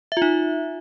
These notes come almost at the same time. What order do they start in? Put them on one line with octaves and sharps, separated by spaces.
E5 F4 D#4